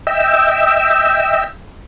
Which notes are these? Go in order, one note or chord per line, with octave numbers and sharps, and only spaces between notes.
D#5 E5 G5 E6